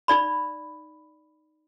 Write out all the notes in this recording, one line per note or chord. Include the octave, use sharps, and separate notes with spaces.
D#4 D5 B5